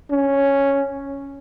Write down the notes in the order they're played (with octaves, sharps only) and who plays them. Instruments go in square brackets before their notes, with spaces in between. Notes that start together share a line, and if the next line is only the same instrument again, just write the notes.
[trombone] C#4